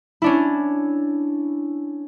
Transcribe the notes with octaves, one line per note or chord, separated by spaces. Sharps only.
C#4 D4 E4